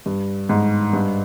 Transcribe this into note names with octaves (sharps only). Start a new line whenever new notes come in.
G2
G#2
G2